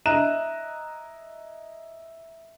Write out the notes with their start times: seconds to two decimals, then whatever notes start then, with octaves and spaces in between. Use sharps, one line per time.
0.06 E4 D#5 A#5 F#6 E7